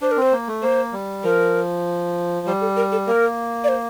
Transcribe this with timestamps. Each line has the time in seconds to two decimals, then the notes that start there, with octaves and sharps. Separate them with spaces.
0.01 D4 C5
0.11 A#4
0.17 C4 C5
0.32 A#3
0.48 A3
0.62 A#3 C5
0.93 G3
1.24 F3 A#4
2.47 G3 C5
2.61 A4
2.76 A#4
2.92 A4
3.07 A#3 A#4
3.64 D5
3.68 C5